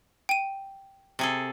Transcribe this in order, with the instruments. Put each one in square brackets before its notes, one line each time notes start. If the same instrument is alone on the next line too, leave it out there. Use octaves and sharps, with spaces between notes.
[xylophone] G5 D#7
[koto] C3 G#4 A4